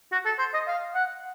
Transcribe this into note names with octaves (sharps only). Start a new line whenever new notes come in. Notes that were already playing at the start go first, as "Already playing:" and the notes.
F#4
A4
C5
D#5
F5
F#5